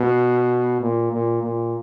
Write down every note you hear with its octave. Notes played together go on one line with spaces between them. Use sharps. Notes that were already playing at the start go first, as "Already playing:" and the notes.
Already playing: B2
A#2
A#2
A#2